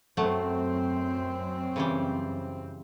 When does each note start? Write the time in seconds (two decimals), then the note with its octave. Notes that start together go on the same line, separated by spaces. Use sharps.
0.17 F#2 F#3 A3 C4 F#5
1.76 C#3 E3 G3